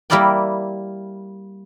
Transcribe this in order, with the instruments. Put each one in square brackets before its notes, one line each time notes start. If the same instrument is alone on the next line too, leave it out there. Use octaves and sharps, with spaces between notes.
[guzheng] G3 A#3 E4 A#4 D5 G5